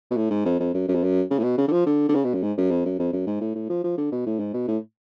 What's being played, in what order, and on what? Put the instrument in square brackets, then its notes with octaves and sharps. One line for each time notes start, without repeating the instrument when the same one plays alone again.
[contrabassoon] B2
A2
G#2
F2
F2
F#2
F#2
F2
F#2
C#3
A2
B2
C#3
D3
F3
D3
D3
C#3
B2
F#2
G#2
F#2
F2
F#2
F2
F#2
G#2
A2
A2
F3
F3
D3
B2
A2
G#2
B2
A2